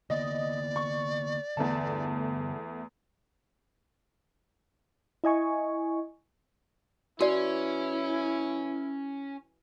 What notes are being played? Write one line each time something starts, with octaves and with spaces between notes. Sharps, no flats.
D3 A#3 B3 D5 D#5
C#6
E2 G2 D3 A3 B3 A5
E4 D#5 G#5 C#6
E3 C#4 E4 F#4 D5